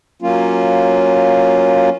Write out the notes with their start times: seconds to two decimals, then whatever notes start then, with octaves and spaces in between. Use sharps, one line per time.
0.22 F#3 A#3 C#4 F4